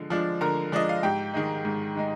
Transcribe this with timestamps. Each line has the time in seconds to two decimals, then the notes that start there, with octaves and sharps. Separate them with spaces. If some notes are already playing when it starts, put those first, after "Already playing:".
Already playing: D3 F3 G#3
0.10 F3 G#3 D4
0.41 D3 A#4 A#5
0.72 F3 G#3 D4 D#5
0.89 F5
1.03 G#2 G4 G5
1.34 D#3 G#3 D#4
1.65 G#2
1.95 D#3 G#3 D#4